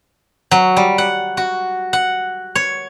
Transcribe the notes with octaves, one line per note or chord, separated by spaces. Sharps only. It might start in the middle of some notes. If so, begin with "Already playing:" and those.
F#3
G3
F#5
F#4
F#5
C#5